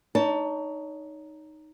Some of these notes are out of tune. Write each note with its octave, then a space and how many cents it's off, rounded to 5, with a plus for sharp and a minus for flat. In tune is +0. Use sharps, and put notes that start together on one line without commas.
D#4 +0 C#5 +30 A5 +5